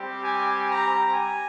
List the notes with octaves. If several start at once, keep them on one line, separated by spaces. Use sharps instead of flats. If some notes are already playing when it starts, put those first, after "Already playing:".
Already playing: G3 C4 G4
G#5
A#5
G#5